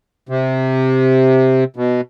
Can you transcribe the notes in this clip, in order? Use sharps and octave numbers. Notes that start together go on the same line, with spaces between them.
C3
B2